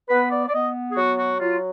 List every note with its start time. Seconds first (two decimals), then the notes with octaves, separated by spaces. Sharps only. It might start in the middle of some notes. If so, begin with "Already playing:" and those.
0.08 B3 B4
0.31 D5
0.47 D5
0.52 B3 D#5
0.92 G#4
0.97 F#3 F#4
1.19 F#4
1.40 F#3 F4